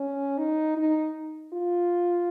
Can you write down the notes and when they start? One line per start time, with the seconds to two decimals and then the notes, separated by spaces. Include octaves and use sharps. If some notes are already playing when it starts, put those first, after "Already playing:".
Already playing: C#4
0.38 D#4
0.77 D#4
1.53 F4